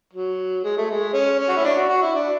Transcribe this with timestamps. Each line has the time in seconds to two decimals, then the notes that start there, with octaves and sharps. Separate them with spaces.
0.13 F#3
0.64 G#3
0.78 A3
0.91 G#3
1.13 C#4
1.39 C#4
1.49 F#4
1.57 E4
1.64 D4
1.77 F#4
1.89 F#4
2.02 E4
2.15 D4